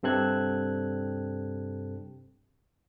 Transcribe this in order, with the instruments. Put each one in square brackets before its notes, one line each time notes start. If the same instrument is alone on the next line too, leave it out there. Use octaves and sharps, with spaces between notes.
[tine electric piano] G2 C3 C4 A4 F#6 G#6